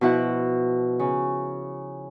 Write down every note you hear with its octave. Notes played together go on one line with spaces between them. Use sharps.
B2 F3 E4 F#5
C#3